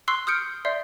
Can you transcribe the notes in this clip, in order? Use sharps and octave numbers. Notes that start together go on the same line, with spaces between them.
C6 C#6 E6 F#6 C7
D#6 F6 G6 C#7 D7
D5 E5 C6 G6 C7